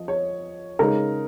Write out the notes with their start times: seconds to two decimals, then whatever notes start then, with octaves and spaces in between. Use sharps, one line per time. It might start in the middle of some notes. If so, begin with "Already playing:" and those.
Already playing: F3 D#5
0.08 C#5
0.79 C#3 G#3 D#4 A#4